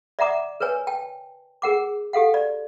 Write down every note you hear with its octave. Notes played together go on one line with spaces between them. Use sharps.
D5 E5 F#5 A#5 D6 D#6
A#4 B4 C#5 G#5
G5 A5
G#4 A#4 F#5 D6
G4 A4 F5 F#5
D5